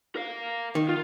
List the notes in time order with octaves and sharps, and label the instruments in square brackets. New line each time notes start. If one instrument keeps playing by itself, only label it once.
[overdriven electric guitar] A#4 F5
[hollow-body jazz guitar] D#3
[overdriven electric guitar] F4